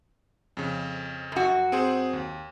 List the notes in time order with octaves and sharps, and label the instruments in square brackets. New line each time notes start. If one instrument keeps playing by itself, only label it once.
[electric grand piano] F2 C#3
[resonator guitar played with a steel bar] F#2 F#4
[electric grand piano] C4 G#4 C5
D#2